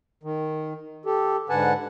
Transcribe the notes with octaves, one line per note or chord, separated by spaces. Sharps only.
D#3
G4 A4
G#2 D3 B4 F#5 G#5 A5